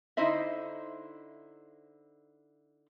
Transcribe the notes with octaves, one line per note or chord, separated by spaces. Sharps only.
D3 D#4 E4 C5 D#5 E5